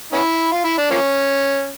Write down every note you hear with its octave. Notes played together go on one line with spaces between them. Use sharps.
B3 C#4 E4
F4
E4
D4
F3 A#3 C#4